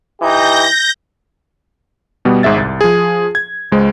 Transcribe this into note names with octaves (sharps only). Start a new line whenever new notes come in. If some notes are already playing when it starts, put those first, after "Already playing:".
E3 D#4 G4 G6 A#6
B2 G3 B3
G#1 G#2 G#4 E5 A6
C2
F3 G#4
G#6
C#2 G#3 C5